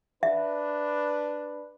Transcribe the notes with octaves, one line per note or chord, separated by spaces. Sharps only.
D4 B4 E5